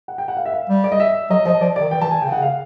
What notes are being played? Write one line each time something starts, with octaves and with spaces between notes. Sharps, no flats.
F#5
G5
F#5
F5
E5
F5
G3
D5
D#5
E5
F#3 D#5
F3 D#5
F3 D5
D#3 D5
E3 G5
E3 A5
G#5
C#3 G5
F#5
F5